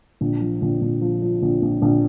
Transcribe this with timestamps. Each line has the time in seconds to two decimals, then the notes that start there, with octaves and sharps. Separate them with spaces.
0.21 A#1
0.41 F3
0.62 A#1
0.81 A#1
1.01 F3
1.22 F3
1.42 A#1
1.62 A#1
1.82 A#1